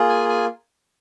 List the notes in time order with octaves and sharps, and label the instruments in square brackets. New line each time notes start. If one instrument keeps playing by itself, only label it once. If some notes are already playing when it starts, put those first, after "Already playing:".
Already playing: [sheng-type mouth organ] A#3 F4 G#4
G#5
G#5